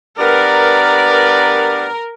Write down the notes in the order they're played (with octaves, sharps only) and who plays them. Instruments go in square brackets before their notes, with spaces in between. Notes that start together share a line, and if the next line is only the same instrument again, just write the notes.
[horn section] G2 B3 D5 [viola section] A#4